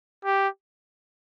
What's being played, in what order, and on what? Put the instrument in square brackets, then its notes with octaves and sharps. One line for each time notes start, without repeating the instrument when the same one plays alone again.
[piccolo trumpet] G4